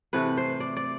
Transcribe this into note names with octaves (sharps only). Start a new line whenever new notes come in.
C3 E3 A3 B4
C5
D5
D5